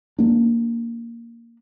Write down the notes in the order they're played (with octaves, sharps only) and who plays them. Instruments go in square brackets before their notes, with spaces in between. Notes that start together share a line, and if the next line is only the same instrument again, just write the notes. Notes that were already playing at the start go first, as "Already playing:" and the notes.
[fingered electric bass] A#3 D4